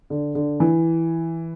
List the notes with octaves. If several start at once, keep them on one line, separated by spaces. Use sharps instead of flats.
D3
D3
E3